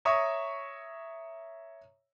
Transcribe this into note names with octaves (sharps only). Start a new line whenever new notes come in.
C#5 E5 A#5 C#6 D#6